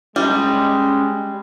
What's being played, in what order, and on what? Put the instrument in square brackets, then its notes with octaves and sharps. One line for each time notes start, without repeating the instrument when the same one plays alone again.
[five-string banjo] G3 [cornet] G#3 [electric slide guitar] C#4 D#5